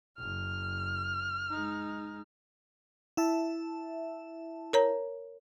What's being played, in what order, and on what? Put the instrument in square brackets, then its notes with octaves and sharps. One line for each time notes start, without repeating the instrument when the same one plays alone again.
[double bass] F#1 [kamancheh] F6
[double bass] G#3 D#4
[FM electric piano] E4 E5 A5
[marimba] A#4 C#5 A#5